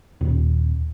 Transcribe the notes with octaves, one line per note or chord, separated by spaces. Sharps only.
D#1